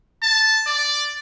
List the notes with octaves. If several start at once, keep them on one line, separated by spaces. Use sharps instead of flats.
A5
D5